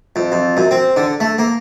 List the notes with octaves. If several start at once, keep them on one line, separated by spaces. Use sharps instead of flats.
F2
F2
F#2
C4
D3
A3
A#3